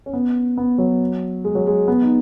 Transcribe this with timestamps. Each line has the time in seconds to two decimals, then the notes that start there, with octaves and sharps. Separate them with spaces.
0.06 C#4
0.13 B3
0.57 B3
0.78 F#3
1.45 G#3
1.55 F#3
1.67 G#3
1.88 B3
2.02 D#4